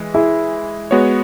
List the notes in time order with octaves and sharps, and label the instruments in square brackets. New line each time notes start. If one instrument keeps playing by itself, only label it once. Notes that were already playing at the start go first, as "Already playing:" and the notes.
Already playing: [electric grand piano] E3 G#3
[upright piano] E4 G#4
[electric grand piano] G#3 B3 F#4 C#5